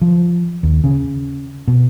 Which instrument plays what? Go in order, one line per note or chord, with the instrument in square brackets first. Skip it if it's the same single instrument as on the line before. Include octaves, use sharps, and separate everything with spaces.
[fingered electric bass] F3
D#2
C#3
B2